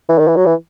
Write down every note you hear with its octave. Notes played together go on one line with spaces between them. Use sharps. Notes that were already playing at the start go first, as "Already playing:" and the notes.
E3
D#3
E3
F#3
E3